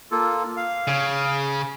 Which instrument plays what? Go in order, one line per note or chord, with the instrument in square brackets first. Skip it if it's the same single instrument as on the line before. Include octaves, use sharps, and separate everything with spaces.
[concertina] A#3 F4 A4
F5
[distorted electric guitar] C#3